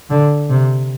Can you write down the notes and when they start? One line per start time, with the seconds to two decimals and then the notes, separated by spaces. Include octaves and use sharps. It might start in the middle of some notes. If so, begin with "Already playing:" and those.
0.10 D3
0.50 C3